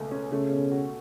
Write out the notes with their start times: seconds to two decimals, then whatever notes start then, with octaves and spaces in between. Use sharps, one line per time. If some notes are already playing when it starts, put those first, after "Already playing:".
Already playing: C#2 B2 A3
0.11 C#4
0.32 C#3 A3
0.51 B2
0.72 F#4